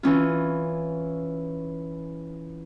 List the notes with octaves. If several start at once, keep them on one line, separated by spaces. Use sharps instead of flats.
E3 C#4 F4